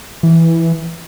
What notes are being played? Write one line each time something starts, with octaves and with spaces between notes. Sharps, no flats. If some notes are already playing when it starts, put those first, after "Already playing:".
E3